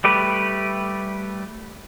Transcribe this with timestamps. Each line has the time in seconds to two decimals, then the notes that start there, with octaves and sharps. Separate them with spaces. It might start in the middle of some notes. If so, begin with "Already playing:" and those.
0.04 G3 A3 G4 B4